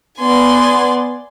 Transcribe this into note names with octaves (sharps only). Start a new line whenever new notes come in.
B3 D5 G#5 C6